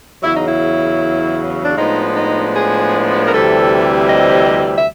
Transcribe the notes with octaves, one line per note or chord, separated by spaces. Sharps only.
E2 C#3 F#3 E4
D#4
E4
D4
A2 F3 G#3 B3 D4 D#4
D#4
G#4
A#4
D2 C3 E3 G3 C4 A4
D#5
E5